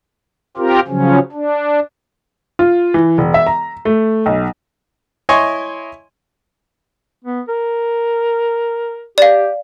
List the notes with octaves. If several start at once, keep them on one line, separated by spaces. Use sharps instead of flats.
C4 F4 G4 A#4
C#3 F3 F#3 C#4
D4
F4
E3
E1
E5
A#5
A3
B1
E4 C#5 D#5 G#5 C6 C#6
B3
A#4
G4 D5 F5